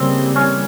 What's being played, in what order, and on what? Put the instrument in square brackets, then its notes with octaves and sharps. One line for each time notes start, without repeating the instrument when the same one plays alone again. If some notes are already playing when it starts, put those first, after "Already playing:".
Already playing: [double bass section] C#3 E3 G3 A#3 [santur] C4
[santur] C#4